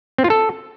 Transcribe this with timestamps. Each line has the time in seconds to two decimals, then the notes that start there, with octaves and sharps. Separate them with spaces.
0.18 C4
0.24 F4
0.30 A4